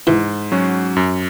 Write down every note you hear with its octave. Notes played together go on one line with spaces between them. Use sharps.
G#2 E3 E4
F#3 C#4 F#4
F#2